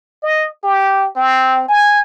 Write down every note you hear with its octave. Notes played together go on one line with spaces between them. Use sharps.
D#5
G4
C4
G#5